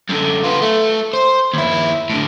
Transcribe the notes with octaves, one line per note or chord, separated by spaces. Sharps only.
F#2 D3
B3 F4
A3
C5
D#2 E4
A2 D3